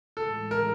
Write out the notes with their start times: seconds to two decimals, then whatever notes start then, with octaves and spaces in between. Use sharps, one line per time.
0.17 A2 E3 G#3 A4
0.51 A#4